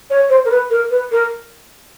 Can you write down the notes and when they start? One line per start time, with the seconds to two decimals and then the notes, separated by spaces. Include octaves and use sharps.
0.10 C#5
0.29 C5
0.45 A#4
0.51 B4
0.70 A#4
0.91 B4
1.12 A#4